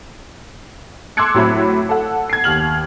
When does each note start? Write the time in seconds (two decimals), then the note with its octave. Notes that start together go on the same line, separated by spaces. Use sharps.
1.17 C6 D6 E6 F#6 G#6 C#7
1.34 A2 F#3 C4 E4 B5
1.89 A4 F#5
2.30 G#6 C7
2.44 D#2 F6 F#7